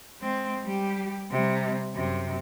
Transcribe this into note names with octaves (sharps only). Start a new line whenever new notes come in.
G#3 C4
G3 G4
C3 G3
F#2 C3